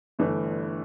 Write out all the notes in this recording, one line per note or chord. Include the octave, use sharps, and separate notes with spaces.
G1 G2 E3 A3